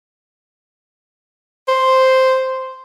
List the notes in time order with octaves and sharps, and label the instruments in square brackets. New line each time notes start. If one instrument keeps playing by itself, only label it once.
[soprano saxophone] C5